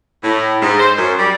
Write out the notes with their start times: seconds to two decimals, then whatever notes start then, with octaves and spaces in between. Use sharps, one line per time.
0.24 A2
0.62 G#2
0.79 C5
0.96 F#2
1.19 G3